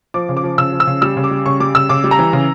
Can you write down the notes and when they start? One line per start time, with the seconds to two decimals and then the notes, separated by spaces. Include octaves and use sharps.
0.14 F3 D6
0.29 C#3
0.37 D6
0.43 F3
0.58 C#3 E6
0.73 F3
0.80 E6
0.87 C#3
1.02 G3 E6
1.17 C#3
1.24 D6
1.31 G3
1.46 C#3 C#6
1.60 G3 D6
1.75 C#3 E6
1.89 C#3 D6
2.04 G3
2.11 A#5
2.19 E3
2.33 C#3